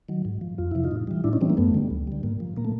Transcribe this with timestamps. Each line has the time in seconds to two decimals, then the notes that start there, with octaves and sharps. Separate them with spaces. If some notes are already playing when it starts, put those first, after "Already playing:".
0.09 D#3 F#3
0.25 G#2
0.41 F3
0.58 F2 F4
0.71 C3 F3 E4
0.84 D#4 F4
0.91 A2
1.07 E3 G3
1.24 A2 D4 E4
1.33 C#4 D#4
1.41 E3 G3 C4 D4
1.50 A#3
1.57 F#2 A3 B3
1.74 D3 G3
1.90 D2
2.07 D3 G3
2.23 G#2 A#3
2.40 F3
2.56 A#2 A#3
2.65 A3